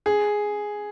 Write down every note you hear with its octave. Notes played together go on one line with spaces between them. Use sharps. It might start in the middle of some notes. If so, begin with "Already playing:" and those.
G#4